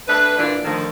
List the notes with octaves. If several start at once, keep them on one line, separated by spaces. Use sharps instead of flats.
A3 D4 B4
A#2 E3 D4 F4
D3 D#3 F3 A3 A4